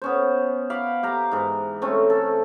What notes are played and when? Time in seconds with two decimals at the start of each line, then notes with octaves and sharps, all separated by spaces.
0.02 B3 C#4 C5
0.70 F5 B5 D6
1.03 G4 F5 A#5
1.31 G#2 E3
1.82 A3 C4 C#4
2.10 A4